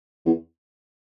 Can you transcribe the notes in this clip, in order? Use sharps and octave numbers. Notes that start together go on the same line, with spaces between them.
E2